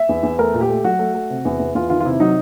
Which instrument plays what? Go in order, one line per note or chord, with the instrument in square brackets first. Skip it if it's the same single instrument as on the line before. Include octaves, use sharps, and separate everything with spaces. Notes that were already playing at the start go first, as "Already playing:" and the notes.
Already playing: [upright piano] E5
E2
E2
A3 A#4
A#2
G4
A3
F#3 F#4
A3
A3
C3
E2
E2
E2 F4
D#3 F4
F4
C3 E4
F#3 D#4